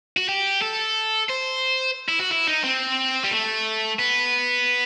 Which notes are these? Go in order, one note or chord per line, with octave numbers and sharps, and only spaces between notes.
F#4
G4
A4
C5
E4
F#4
E4
D#4
C4
G3
A3
B3